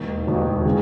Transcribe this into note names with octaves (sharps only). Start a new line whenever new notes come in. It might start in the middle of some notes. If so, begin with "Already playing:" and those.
Already playing: E1 D#2 D#3
E1 D#2 D#3
D#3 G#3